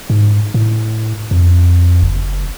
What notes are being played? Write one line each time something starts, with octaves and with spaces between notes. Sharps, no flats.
G#2
A2
F2
F#1